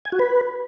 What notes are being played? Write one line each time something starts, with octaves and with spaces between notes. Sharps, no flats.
G#5
F#4
B4